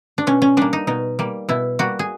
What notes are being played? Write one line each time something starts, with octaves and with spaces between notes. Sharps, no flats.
D4
B2 C#4
C#4
G3 A#3 D4
D#4
B2 D#4
G3 A#3
B2 E4
G3 A#3 F#4
G#4